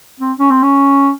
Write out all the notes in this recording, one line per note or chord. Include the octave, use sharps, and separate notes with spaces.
C4
C#4
C4
C#4